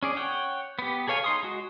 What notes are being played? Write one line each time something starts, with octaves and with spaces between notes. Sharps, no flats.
C#4 G#4 D5
C#5 F#5 G5
B3 G4
G#4 A4 C#5 F5 G#5
D#4 C6 D#6
G#3 F#4